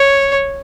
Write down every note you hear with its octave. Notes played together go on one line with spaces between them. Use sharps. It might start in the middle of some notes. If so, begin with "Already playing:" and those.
Already playing: C#5